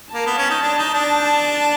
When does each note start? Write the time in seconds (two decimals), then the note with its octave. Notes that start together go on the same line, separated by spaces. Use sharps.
0.14 A#3 A5
0.26 B3
0.38 C#4
0.50 D#4
0.62 D4
0.78 D#4
0.94 D4
1.10 A5